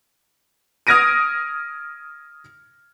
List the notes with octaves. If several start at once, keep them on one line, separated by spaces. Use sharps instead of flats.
D#6 F6 G#6 A#6 D7 D#7